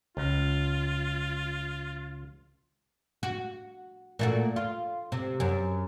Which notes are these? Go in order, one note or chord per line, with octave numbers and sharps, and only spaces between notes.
C#2 F4
F#4
A#2 A3 F#4
F4
C3
F#2